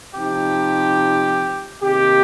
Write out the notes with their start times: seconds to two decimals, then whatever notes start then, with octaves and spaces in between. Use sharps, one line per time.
0.15 C3 F3 D#4 G4
1.84 C3 D#3 A#3 G4